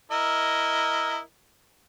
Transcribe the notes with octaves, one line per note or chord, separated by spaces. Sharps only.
E4 A#4 D#5